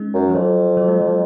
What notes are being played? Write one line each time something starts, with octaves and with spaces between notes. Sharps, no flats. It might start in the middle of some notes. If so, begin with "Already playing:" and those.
Already playing: G#3 C4 C#4 D#4
F#2
F3
F2 F#3
F#3
G#3
F#3